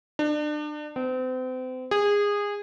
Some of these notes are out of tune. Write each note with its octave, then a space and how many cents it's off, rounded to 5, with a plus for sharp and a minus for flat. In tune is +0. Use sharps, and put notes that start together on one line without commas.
D4 +35
C4 -35
G#4 -20